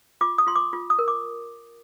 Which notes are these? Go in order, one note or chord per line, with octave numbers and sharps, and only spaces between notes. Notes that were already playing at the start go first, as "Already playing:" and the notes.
F4 D6
D#6
F4 C6
D6
F4
D#6
A#4
D6